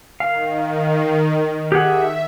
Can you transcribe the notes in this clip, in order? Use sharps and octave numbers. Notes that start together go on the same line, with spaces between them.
D#3 F5
G4 G#4 E5 F#5